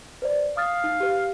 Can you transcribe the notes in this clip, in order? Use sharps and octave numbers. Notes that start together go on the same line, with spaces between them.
B4 C5 D5
F5 D#6 F6 A6
D#4
G4 B4